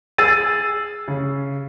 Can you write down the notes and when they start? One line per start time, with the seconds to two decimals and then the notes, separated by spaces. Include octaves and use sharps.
0.18 G#4 E6 A6 D#7
1.08 C#3